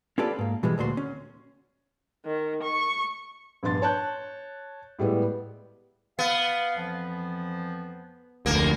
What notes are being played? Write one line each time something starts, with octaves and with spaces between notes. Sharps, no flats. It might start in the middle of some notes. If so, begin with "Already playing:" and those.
C#4 F4 G4 A4 B4 D5
G#2 A#3
B2 E3 G3 G#3
D2 A#2 F#4 C6
C#4
D#3
C#6
A#1 G2 B3 C6 A6
C#5 A5 F#6 G6
A2 G3 G#3 B3 E4
B3 F5
F2 E3 F3
F1 D2 F3 A#3 A#4